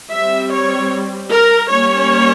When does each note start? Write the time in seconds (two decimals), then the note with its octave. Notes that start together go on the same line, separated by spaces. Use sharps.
0.11 G3 C4 E5
0.52 C#5
1.31 A#4
1.71 G3 A#3 C#4 C#5